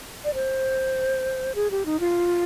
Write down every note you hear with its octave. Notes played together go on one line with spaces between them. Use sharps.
D5
C5
G#4
G4
D#4
F4